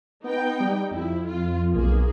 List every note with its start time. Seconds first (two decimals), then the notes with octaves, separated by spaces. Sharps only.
0.24 B3 D#4 G5
0.60 G3
0.91 F2 E4
1.27 F4
1.74 B1 A#3 G#4